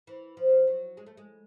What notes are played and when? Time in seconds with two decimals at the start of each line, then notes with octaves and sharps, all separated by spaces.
0.07 E3
0.37 F3
0.67 F#3
0.97 G#3
1.07 A3
1.17 G#3